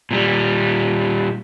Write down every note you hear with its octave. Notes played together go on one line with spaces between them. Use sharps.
A#2 G3